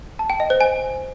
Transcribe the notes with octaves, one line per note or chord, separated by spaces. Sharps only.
A5
G5
D#5
C5
G#5